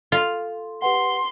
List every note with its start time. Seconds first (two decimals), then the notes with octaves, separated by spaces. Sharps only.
0.12 F4 A4 C6
0.82 G4 B4 F#5 C6